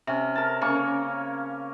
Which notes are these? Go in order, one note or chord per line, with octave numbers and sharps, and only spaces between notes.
C3 C#4
A#4 A5
C#3 A#3 C#4 C#6